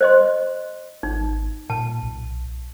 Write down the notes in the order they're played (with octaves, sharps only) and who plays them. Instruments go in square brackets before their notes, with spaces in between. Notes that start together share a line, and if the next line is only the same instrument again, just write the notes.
[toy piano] C5 D#5 C6
[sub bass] G#1 [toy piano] D#4
[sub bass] A#2 [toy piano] A5
[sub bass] B1